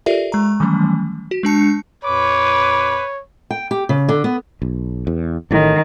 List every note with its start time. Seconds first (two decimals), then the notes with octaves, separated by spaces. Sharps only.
0.06 F4 G4 A4 A#4 D5 E5
0.32 G#3 A#5
0.60 D#3 E3 F#3 G3 A3 C#4
1.31 F#4
1.43 G#3 D4 A5 C#7
2.05 F2 A#2 B4 C#5 D6
3.51 G5
3.71 G4
3.89 C#3
4.09 D3
4.24 B3
4.62 B1
5.07 E2
5.51 A1 A2 D#3